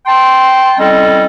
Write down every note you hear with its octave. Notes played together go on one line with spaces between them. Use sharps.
G5 A5 C6
G3 C4 C#4 E4 A4 D#5